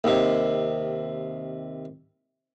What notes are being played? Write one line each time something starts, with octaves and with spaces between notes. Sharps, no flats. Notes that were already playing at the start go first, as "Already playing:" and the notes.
D#2 C3